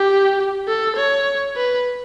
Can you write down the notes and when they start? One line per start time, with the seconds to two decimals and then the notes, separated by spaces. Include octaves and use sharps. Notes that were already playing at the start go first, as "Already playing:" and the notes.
Already playing: G4
0.67 A4
0.96 C#5
1.56 B4